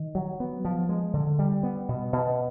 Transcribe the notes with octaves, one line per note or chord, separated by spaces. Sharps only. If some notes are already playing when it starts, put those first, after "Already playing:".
Already playing: D#3
F#3
B3
F3
G#3
D3
G3
B3
B2
B2